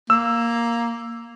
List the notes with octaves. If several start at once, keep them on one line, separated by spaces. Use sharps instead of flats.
A#3 E6